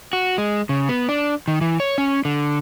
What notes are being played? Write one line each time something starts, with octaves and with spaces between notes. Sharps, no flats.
F#4
G#3
C#3
B3
D4
D#3
E3
C#5
C#4
D3